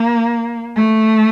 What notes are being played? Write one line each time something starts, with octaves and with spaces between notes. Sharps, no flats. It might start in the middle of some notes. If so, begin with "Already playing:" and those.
Already playing: A#3
A3